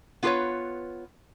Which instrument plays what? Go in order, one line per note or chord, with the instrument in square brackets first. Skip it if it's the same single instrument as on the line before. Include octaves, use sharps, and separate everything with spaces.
[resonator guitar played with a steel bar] B3 F4 G4 A4 B4 C#5